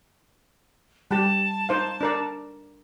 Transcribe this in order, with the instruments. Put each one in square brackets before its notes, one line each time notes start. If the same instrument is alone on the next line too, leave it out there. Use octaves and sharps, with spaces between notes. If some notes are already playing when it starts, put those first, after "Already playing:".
[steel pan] G3 G4 [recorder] A5
[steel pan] D#4 C5 F5
D4 A#4 D5